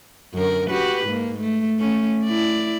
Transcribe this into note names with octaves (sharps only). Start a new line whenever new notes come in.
F#2 D3 A#4
F#4 G4 B4
G#2 A#3
A3
A3 C#4
E4 D5